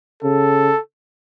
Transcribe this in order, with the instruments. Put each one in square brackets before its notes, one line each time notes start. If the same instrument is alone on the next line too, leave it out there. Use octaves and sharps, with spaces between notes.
[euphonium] C#3 [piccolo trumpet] A4